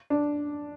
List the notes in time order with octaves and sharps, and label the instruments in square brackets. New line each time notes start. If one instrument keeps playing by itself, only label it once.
[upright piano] D4